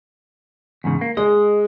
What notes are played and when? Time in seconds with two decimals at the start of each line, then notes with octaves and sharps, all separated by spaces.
0.84 E2 G#2 C#3
1.01 A#3
1.17 G#3 D#5